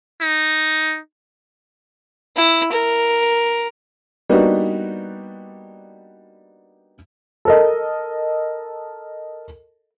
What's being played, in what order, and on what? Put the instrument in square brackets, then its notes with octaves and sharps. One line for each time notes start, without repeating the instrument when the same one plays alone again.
[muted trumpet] D#4
[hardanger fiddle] E4
A#4
[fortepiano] G3 A#3 B3 D4 D#4 F#4
[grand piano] A4 A#4 D#5